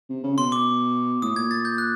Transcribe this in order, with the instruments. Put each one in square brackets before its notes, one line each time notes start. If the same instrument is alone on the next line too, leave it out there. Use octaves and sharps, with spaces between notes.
[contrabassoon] C3
C#3
[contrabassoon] B2 [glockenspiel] C6
[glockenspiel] D6
[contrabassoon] A2 [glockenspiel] D#6
[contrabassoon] A#2 [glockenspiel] G#6
[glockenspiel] A6
G6
F#6